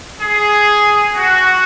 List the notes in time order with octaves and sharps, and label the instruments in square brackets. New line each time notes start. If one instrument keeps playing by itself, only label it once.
[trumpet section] G#4
F#4